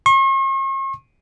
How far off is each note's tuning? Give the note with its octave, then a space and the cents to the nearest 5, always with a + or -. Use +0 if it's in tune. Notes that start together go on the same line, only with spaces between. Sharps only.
C#6 -45